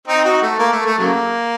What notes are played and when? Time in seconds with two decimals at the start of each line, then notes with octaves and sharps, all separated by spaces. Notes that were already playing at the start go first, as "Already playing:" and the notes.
0.07 C4 D#4
0.25 D#4 F#4
0.42 A3
0.59 A#3
0.73 A3
0.85 A3
0.99 C#3 F#3 A#3